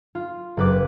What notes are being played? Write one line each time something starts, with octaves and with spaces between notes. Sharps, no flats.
F4
F#1 B4 D6